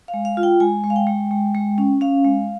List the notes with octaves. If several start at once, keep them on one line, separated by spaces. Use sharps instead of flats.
F5
G#3
F5
F4
G5
G#3 G#5
G#3
F5
G5
G#3
G#3
G#3
C#4
C#4 F5
G#3